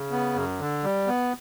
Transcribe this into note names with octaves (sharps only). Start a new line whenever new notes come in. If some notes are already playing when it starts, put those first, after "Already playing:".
Already playing: C#3
B3
F#2
D3
G3
B3